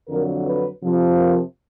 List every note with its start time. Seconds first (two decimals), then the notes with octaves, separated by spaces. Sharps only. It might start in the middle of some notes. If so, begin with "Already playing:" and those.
0.09 F2 D3 F#3 A#4
0.45 B4
0.81 F2 C3 F3
1.17 A#4